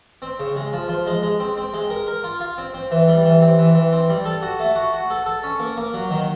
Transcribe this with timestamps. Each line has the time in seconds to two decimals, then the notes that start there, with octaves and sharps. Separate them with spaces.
0.22 C4
0.40 C#3
0.56 G#3
0.73 F3
0.89 F3
1.07 G#3
1.22 G#3
1.40 C4
1.57 C4
1.74 G#3
1.90 A#4
2.07 A#4
2.24 F4
2.40 F4
2.58 C4
2.74 C4
2.91 E3
3.08 G3
3.25 E3
3.42 C4
3.59 E3
3.75 E3
3.93 C4
4.09 G3
4.25 A4
4.42 F#4
4.60 A3
4.76 F#4
4.93 F#4
5.10 A4
5.26 A4
5.43 C#4
5.60 A#3
5.77 A#3
5.94 F#3
6.11 D#3